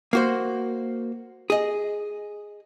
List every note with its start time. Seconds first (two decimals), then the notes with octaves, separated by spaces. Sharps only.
0.13 A#3 F#4 C5
1.50 G#4 D#5